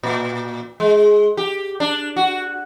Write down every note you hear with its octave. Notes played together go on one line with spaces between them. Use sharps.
A#2
G#3
G4
D4
F#4